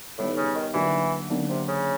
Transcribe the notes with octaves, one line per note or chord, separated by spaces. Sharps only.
A2 D#3 G3 B3
C#3
D#3
D3 E3 F#3 A#3 D4 F#4
D3 F#3 A#3 D4
C3
C#3